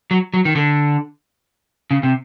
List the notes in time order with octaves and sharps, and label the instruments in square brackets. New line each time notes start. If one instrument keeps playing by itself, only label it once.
[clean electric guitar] F#3
F#3
D#3
D3
C#3
C3